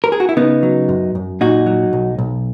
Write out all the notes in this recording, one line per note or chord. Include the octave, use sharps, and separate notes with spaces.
A#4
G#4
F#4
E4
C#3 B3 D#4
F#3
F#2
F#2
A#2 D#4 F#4
F#3
B1
B1